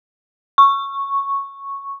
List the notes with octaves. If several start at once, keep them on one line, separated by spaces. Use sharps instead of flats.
C#6